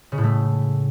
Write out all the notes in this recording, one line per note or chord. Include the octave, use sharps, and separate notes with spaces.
C#3
A2
A3